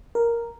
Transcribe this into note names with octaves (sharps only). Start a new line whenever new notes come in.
A#4